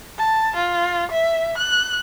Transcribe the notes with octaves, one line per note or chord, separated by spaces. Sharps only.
A5
F4
E5
F#6